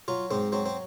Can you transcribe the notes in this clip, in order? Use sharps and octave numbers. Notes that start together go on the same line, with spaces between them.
F#3 F4
G#2 C4
F#3 C4
C4